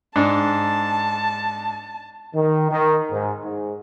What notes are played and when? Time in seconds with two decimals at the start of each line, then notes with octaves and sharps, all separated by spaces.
0.16 G#2 D4 A5
2.35 D#3
2.71 D#3
3.12 G#2
3.44 G#2